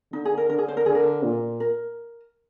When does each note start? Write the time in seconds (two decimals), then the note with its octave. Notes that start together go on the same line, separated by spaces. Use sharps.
0.12 D3 D#4
0.25 G#4
0.38 A#4
0.49 D3 A#4
0.59 G#4
0.68 C5
0.77 A#4
0.86 D3 G#4
0.95 A#4
1.23 A#2
1.60 A#4